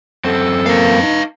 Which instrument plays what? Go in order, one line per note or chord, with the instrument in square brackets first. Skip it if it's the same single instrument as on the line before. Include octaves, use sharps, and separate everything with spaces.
[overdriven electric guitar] F#2 C4 [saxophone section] A4
[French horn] A#3 [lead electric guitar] B4 F5
[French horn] D#4